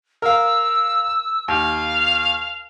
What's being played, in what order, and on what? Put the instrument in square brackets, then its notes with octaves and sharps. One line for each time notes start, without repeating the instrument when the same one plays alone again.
[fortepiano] A#4 F5 [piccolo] E6
[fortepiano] D#2 [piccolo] F5